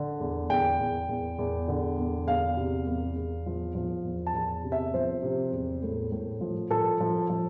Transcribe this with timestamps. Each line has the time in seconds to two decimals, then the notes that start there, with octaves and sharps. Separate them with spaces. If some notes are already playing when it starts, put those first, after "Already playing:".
Already playing: D3
0.20 E2
0.50 E2 G5
0.79 E2
1.09 E2
1.39 E2
1.68 D3
1.98 E2
2.27 E2 F5
2.57 C3
2.87 E2
3.16 E2
3.46 F3
3.75 F3
4.04 E2
4.27 A5
4.34 E2
4.64 C3
4.72 E5
4.94 F3 C5
5.23 C3
5.52 E2
5.83 A2
6.12 A2
6.41 F3
6.71 F3 A4
7.00 F3
7.30 F3